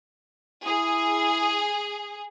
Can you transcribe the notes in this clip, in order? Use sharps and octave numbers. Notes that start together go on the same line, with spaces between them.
E4 G#4 D#6